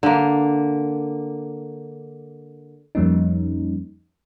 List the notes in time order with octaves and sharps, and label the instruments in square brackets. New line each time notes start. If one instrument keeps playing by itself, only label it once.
[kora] D3 A#3
[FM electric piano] F2 F3 G3 A#3 C#4 D#4